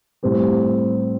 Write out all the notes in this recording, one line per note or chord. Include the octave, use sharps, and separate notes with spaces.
A2 G3 C4 G4